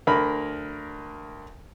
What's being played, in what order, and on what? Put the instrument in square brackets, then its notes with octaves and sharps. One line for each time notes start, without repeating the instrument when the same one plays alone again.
[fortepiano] D2 A#4 B5